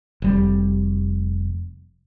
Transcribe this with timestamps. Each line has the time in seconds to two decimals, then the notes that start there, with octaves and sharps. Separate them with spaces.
0.22 F1 G3